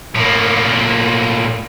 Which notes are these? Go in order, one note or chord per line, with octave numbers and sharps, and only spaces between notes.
A2 A#3